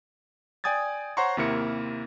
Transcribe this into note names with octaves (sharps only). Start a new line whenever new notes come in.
D5 G5 G#5 D#6 G#6 A6
C5 C#5 F#5 A#5 C6 C#6
D#2 C3 A#3 E4 A#4 C#7